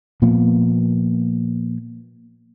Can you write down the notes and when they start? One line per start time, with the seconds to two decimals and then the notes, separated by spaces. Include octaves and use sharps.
0.22 A#2 F3 A#3 B3